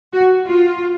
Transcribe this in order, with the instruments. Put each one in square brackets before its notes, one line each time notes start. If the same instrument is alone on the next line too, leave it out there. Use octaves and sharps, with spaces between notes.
[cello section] F#4
F4